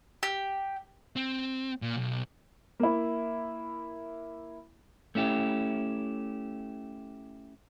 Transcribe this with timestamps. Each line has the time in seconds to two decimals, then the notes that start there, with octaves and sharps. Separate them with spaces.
0.23 G4
1.16 C4
1.82 A#2
1.97 B1
2.80 A#3 E4
5.15 A3 C#4 E4 G4